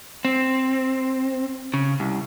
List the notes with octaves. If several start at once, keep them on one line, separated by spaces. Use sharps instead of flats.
C4
C#3
C2